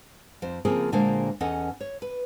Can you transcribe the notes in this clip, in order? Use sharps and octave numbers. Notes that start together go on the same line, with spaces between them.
F2 C5
C#3 F3 A#3 C4 G#4
A#2 D3 G#3 A#3 C5 F5
E2 C#4 A4 D#5 F#5
C#5
B4